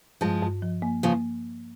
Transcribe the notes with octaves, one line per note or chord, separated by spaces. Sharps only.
G2 F3 G#3
G2
F3
A#3
C#3 F3 A#3